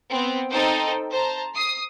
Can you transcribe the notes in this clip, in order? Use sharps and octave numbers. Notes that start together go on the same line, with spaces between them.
B3 C4
C4 D#4 A4 C5 G5
C5 A5 A#5
D#6 C7